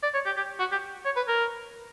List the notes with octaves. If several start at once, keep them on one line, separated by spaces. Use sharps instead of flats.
D5
C#5
G4
G4
F#4
G4
C#5
B4
A#4